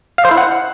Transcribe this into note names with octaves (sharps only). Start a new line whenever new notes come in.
F5
C5
E4
F#5